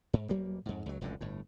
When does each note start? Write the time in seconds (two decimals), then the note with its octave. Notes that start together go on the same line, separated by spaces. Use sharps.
0.13 G#2
0.29 E1 F#3 G3 A#3
0.66 F2 G#2
0.86 C#2 F#3
1.01 F1 C#2 F#2 D3
1.21 G1 A2